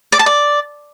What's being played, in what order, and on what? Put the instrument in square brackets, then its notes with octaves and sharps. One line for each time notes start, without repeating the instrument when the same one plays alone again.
[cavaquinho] D5
A5
D5